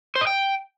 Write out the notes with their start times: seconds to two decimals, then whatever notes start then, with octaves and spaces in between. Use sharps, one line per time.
0.16 C5
0.21 D#5
0.27 G5